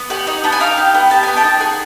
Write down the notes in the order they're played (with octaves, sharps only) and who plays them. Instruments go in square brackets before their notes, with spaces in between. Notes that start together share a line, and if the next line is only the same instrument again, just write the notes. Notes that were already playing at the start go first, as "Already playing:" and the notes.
Already playing: [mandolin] B3
G4 F#5 G#5
D#4
B3 A5
G#5
D#4 F5 G5
G4
B3
G4 A5
B3 G#5
G5 A5
D#4
G#4 F#5 G#5